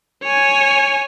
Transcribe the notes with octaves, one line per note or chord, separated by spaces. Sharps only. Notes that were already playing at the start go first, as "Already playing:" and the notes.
C#5 G#5